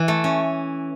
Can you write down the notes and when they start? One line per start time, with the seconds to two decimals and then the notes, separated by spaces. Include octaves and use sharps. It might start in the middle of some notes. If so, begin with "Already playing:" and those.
Already playing: E3
0.08 A3
0.24 C#4